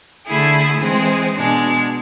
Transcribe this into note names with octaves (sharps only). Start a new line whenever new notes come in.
D3 A3 E4 G#4
E3 G#3 C4 G#4
B2 G#3 D4